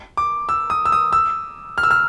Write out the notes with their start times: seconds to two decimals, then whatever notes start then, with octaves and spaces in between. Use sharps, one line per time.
0.17 D6
0.49 E6
0.70 D#6
0.86 E6
0.92 D#6
1.13 E6
1.78 F6
1.83 E6
1.91 F6